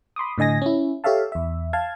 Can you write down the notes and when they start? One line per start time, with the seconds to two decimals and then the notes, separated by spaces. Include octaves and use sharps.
0.16 B5 C6 D6 D#6
0.38 A2 D3 D#5 G#5 A#6
0.62 C#4 E4
1.04 G4 A4 C#5 E5 F5 A5
1.32 E2 E5
1.73 F5 A5 G#6